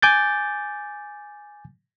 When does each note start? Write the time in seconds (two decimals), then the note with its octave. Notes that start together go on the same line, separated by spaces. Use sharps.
0.02 G#5 D6 G6 A6